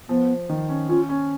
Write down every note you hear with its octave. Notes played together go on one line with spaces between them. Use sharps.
F3 B3
D#3
C#4
C#4 F4
C#4